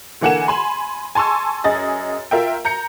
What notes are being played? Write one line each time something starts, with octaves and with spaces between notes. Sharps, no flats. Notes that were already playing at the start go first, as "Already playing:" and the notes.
D3 E3 A#3 F#5 G#5 E7
G#5 B5 C6
G#5 A5 C6 C#6 E6
F#2 G#4 D#5 A6
F4 A#4 E5 G5
A#5 G6 C#7